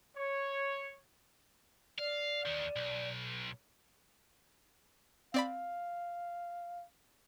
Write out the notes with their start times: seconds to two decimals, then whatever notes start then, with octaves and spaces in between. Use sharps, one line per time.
0.17 C#5
1.99 D5 F5
2.46 D#2 D#3
2.76 B1
5.34 C4 D5 F5 B5